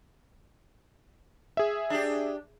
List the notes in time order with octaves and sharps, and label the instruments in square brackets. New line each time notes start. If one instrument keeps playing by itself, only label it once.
[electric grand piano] G#4 E5
[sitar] D4 G4